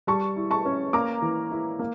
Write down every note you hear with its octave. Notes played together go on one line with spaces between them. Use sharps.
G3 A5 C#6
E4
A5 C#6
C#4
A#3 A#5 D6
E3
E4
A#3